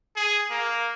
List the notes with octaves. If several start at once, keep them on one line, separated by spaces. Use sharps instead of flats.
G#4
A#3